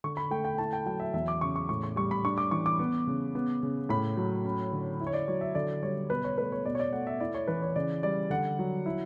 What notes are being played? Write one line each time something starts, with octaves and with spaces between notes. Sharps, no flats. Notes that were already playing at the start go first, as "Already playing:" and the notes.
D3 C#6
B5
A3 G5
G5
E4 A5
G5
F#3 G5
E5
E2 E5
D6
C#3 C#6
C#6
A2 C#6
C#6
G3 C#6
B5
D4 C#6
D6
E3 C#6
D6
B3
C#3
B3
C#3
A2 B5
F#3
C#4
D3
E4
C#5
D5
F#3 C#5
E5
D3 D5
G3 C#5
B2 B4
C#5
A3 B4
C#5
B2 D5
C#5
D5
A3 F#5
E5
E4 D5
C#5
E3 B4
C#5
C#3 D5
G3 D5
D3 F#5
F#3
E4